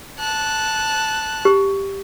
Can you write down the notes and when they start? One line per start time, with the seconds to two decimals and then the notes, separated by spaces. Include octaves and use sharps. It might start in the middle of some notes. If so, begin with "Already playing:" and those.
0.19 A5 F#6
1.45 G4